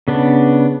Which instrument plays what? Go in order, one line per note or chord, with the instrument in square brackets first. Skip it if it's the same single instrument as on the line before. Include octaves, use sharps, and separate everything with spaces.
[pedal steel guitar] C#3 B3 D4